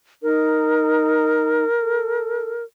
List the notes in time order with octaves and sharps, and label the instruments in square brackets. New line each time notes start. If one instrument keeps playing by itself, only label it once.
[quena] D#4 [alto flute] A#4
[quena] A4